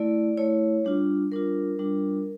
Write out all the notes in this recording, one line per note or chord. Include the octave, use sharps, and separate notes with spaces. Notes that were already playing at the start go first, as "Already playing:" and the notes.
Already playing: A3 E4 D5
A3 E4 C#5
G3 D4 F4
G3 D4 F4 A#4
G3 D4 F4